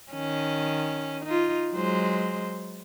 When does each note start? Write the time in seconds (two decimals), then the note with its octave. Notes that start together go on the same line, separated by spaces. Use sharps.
0.13 D#3 C#4
1.25 D#4 F4
1.73 F#3 G#3 C5